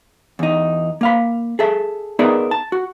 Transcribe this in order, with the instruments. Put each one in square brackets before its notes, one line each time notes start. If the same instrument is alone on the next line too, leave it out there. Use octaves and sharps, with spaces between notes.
[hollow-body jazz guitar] E2 D#4
A#3 F5 B5
G#4 A4 E5
B3 D#4 G#4 A#4 D5 E5
A5
F#4